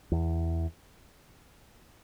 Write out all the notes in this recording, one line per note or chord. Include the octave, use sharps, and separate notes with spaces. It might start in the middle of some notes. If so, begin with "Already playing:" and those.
E2